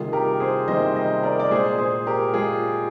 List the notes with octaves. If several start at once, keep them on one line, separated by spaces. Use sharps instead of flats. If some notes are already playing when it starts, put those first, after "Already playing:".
Already playing: C3 D#3 G3 A#3 F4 G#4
G4 A#4
G#4 C5
C3 D#3 G3 A#3 C5 D#5
C5 D#5
A#4 D5
D5
A#2 G#3 G#4 C5
G#4 C5
G4 A#4
A#2 G#3 F4 G#4